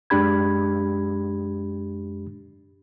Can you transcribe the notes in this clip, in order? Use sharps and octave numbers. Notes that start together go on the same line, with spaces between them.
F#2 G#3 D4 G4 B5 G#6